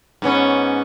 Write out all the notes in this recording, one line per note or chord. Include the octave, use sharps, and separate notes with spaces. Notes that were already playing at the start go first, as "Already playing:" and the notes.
G#2 B3 C#4